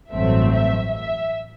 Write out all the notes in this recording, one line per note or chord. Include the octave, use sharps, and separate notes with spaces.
A1 G2 F#3 A3 C4 E5
E5
E5